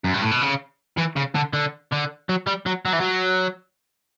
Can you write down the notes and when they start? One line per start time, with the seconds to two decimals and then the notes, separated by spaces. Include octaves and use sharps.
0.04 F#2
0.14 G2
0.22 A2
0.31 B2
0.42 C#3
0.97 E3
1.16 C#3
1.35 D3
1.53 D3
1.92 D3
2.29 F#3
2.47 G3
2.66 F#3
2.85 F#3
2.93 E3
3.00 F#3